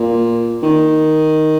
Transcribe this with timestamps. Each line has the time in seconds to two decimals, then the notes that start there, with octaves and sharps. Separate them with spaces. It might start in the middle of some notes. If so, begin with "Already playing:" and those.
Already playing: A#2
0.63 D#3